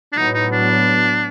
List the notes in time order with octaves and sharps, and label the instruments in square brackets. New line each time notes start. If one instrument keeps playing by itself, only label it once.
[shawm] D4
[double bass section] A2 F#3 B3 [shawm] D#4
[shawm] D#4
D4